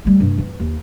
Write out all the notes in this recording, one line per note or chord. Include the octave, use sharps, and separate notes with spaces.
G3 A3
G2 C3
E3
D#2